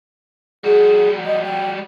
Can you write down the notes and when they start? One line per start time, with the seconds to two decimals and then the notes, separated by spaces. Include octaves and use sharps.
0.64 G3 F#4 G#4
1.25 D#5
1.45 G5